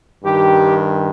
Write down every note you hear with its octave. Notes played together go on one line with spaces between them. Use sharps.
G2 D#3 G4